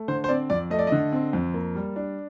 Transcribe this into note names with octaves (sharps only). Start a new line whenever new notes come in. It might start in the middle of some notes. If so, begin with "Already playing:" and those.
Already playing: A3
D3 C5
C5
C4 D5
F2 D5
A3 D#5
D5
D3 D#5
C4
F2
A#3
G3
D4